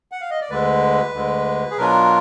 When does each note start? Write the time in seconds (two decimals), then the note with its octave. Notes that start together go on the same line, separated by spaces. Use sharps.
0.12 F#5
0.21 F5
0.31 D#5
0.41 D5
0.50 D2 D3 G#3 B4
1.14 D2 D3 G#3
1.71 G#4
1.77 B2 F#3 D4 F4 A#4